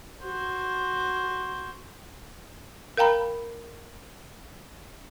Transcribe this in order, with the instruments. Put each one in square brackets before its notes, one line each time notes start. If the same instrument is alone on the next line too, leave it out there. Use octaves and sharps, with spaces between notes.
[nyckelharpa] F#4 C5
[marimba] A#4 F5 G5 A#5 B5